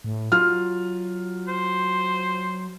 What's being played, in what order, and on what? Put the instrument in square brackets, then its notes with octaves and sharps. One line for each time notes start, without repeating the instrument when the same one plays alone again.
[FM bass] A2
[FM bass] F#3 [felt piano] F4 F6
[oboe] C5